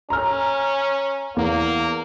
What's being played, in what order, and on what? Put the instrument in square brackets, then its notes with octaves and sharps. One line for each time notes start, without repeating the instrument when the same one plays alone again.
[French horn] C#4 [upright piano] A#5 F6
[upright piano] E2 [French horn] A#3